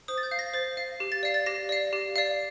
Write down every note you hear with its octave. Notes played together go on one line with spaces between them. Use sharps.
C5 D#6
A6
G6
F5
A#6
C5 A6
F5
G4
A6
D5 F5
A6
G4 A#6
D5 F5
G4
D5 F5